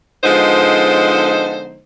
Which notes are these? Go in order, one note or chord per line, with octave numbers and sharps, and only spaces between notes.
D3 F3 G#3 B3 D#4 C5